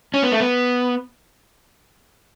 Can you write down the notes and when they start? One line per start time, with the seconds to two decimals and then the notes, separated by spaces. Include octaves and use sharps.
0.14 C#4
0.22 B3
0.31 A3
0.40 B3